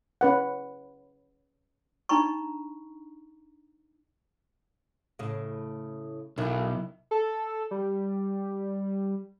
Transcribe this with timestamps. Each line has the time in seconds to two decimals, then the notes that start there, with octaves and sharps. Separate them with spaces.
0.21 C#4 B4 F#5
2.09 D4 D#4 A#5 B5 C#6
5.19 A2 C#3
6.38 B1 D#3 E4
7.11 A4
7.71 G3